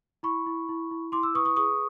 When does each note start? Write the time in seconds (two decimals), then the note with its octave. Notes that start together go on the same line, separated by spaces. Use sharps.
0.23 E4 B5 C#6
0.46 E4
0.69 E4
0.91 E4
1.12 E4 C6 D6
1.23 D6 E6
1.34 B4 C#6 D#6
1.45 C#6 D#6
1.56 G#4 C#6 D#6